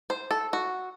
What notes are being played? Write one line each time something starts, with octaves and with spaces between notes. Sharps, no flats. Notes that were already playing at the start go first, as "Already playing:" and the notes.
C5
A4
F#4